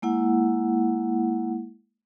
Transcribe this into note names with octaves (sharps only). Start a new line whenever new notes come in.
G#3 A#3 E4 F#5